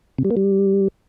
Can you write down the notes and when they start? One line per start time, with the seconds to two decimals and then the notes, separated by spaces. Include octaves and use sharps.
0.18 C3
0.24 G3
0.30 A#3
0.37 G3